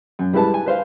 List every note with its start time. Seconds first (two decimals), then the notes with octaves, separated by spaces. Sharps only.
0.19 F#2
0.34 G3 G#3 E4 B4 A5
0.54 G#5
0.66 B4 C5 F5